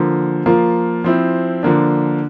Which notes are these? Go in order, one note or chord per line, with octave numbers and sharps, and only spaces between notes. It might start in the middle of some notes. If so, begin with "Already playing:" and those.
Already playing: D3 F3 A#3
F3 A#3 F4
F3 C4 E4
D3 F3 A#3 D4